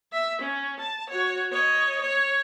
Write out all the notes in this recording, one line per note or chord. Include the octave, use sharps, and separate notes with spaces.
E5
C#4
A5
F#4 C#5
C#5 D#5
C#5